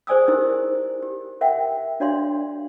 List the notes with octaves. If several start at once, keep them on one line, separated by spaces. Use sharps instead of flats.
G#4 C5 D5 G#5 D#6 E6
D#4 E4 G4 A#4 C5
G4
A#4 E5 F#5 G5
D4 F#4 C#5 D5 F5 C6